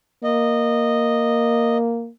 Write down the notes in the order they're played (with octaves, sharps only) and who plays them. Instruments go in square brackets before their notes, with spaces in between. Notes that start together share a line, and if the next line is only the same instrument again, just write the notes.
[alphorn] A#3 [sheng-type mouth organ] D#5